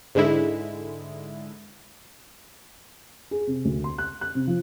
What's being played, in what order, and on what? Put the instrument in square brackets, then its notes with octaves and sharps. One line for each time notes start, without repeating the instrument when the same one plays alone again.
[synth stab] G#2 D3 G#3 E4
[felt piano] G#4
C3
D2
C6
F#6
F#6
C3
F3